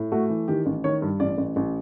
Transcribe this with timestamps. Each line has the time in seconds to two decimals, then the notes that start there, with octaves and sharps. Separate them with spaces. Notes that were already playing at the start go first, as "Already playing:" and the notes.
Already playing: A2
0.12 A3 F#4
0.30 E3
0.48 D#3 G4
0.66 A1
0.84 D#3 C#5
1.02 G2
1.20 A1 D5
1.38 A1
1.56 A1